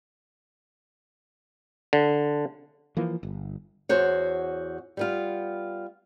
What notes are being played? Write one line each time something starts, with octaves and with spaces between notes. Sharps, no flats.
D3
E3 F3 A#3
G1
E2 F#4 C5 C#5
G3 B3 F4